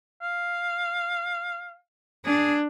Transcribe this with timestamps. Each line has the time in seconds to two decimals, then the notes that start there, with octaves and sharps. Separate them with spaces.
0.22 F5
2.26 D4 G#4